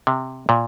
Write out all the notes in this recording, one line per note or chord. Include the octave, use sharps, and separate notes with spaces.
C3
A#2